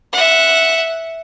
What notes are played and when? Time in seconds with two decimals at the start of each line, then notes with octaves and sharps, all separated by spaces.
0.12 E5 F#5